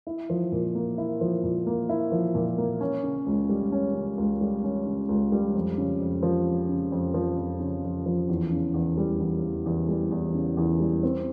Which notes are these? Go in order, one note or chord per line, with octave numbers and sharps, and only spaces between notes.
E4
F3
A#2
A#3
E4
F3
A#2
A#3
E4
F3
A#2
A#3
C#4
C#3
C#2
G3
C#4
C#3
C#2
G3
C#4
C#3
C#2
G3
F2
C#3
F2
F3
F2
C#3
F2
F3
F2
C#3
F2
F3
E2
C#3
E2
G3
E2
C#3
E2
G3
E2
C#3
E2
G3
C4